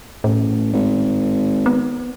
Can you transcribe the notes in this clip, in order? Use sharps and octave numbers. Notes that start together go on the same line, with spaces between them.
A1 A2
G#1
B3